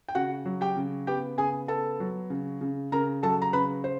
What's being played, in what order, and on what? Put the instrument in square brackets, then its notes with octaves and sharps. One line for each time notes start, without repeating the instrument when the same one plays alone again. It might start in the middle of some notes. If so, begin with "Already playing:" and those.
[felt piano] G5
C#3 F#4 F#5
F#3
G4 G5
C#3
B3 G4 G5
C#3 G#4 G#5
B3 A4 A5
F#3
C#3
C#3
C#3 A#4 A#5
F#3 A4 A5
A#5
C#3 B4 B5
C5